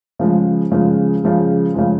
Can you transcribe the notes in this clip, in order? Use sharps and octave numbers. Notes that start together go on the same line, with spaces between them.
C#3 F3 G#3
C#3 F3 G#3
C#3 F3 G#3
C#3 F3 G#3